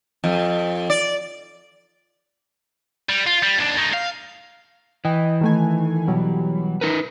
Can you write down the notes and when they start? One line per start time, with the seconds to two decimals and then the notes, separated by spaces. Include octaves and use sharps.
0.24 F2
0.90 D5
3.09 G3
3.26 F4
3.43 G3
3.58 D#2 D4
3.77 A3 D#4
3.93 F5
5.05 E3 D#5 G5
5.41 D#3 A3 G#5
6.08 B2 F#3 G3
6.81 D#4 A#4 B4